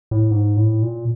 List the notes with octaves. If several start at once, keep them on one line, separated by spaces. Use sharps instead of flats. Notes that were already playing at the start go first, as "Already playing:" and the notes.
A2
G#2
A2
A#2